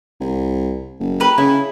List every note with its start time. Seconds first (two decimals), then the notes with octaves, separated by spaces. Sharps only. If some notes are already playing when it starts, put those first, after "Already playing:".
0.20 C2
1.00 F#1
1.20 G4 A#4 B4
1.38 C#3 E4